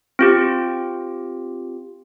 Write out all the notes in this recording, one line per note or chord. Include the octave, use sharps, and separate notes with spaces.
C4 F4 G4